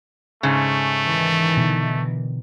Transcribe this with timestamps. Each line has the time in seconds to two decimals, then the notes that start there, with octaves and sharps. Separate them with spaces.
0.43 G#2 C#3 A3
1.02 D#3 E3
1.57 B2 D3